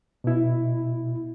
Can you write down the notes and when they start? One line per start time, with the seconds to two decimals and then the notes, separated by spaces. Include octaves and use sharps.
0.24 B2 E4